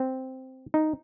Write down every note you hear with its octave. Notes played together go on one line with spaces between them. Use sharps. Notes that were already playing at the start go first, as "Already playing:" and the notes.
Already playing: C4
D#4